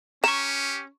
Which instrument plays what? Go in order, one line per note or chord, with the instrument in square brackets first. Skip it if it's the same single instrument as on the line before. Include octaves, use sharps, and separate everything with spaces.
[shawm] C#4 [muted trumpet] G4 [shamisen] A#5 [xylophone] C#6 E7